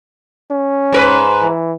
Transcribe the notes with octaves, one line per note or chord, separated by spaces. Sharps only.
C#4
G#2 A#4 B4
E3